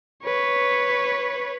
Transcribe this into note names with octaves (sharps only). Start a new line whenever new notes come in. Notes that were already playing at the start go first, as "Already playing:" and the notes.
B4 C#5